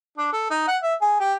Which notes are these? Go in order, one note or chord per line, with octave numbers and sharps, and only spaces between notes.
D4
A4
D#4
F#5
E5
G#4
G4